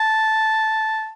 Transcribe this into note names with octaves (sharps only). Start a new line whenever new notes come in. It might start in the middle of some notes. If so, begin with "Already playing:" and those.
Already playing: A5